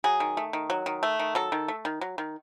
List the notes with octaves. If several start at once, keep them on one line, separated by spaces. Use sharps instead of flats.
F#3 G#4
D#3
A3
D#3
F#3
D#3
A3
D#3
F#3 A4
D#3
A3
D#3
F#3
D#3